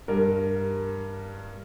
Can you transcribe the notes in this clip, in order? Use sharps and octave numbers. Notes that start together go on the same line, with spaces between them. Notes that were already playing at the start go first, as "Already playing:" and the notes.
G2 A#4